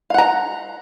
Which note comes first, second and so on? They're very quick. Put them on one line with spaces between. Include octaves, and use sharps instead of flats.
F5 F#5 A#5